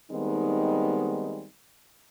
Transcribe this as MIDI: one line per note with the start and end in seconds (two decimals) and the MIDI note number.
0.12 1.46 51
0.12 1.46 55
0.12 1.46 56
0.12 1.46 59
0.12 1.46 60
0.12 1.46 63